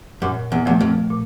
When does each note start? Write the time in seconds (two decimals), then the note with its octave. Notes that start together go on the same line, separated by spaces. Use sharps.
0.22 F#2 A#2
0.52 E2
0.66 E2 F3 A3
0.81 F2
1.10 A#2